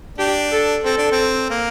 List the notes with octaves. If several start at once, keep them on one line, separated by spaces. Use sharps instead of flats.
D4 G4
A4
C4 A4
D4
C4
A#3